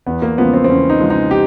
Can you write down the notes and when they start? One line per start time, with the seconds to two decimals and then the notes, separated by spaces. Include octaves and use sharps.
0.07 E2 B3
0.22 A#3
0.38 C#3 F3 G#3 B3
0.54 C4
0.64 C4
0.69 E2 C#4
0.90 D#4
1.00 C#3 F3 G#3
1.10 D#4
1.31 G4